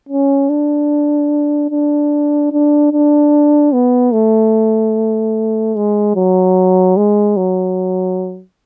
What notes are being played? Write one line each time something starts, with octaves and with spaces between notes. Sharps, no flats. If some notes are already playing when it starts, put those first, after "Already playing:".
C#4
D4
D4
D4
D4
B3
A3
G#3
F#3
G#3
F#3